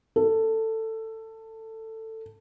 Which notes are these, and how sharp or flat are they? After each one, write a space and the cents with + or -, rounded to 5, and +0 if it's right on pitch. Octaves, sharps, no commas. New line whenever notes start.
A4 +15